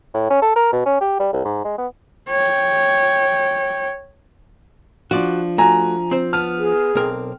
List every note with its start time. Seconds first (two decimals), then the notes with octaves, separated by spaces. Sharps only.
0.14 A2
0.30 C#4
0.42 A4
0.56 A#4
0.72 B2
0.86 C#4
1.01 G4
1.20 G3
1.33 C2
1.45 G#2
1.64 G#3
1.78 B3
2.29 C#5 G5
5.11 F3 D4 F#4 D5
5.58 A3 F#4 G#5 A#5
6.11 C4 C5
6.33 B3 A5 F6
6.59 G#4
6.95 B1 C4 A#4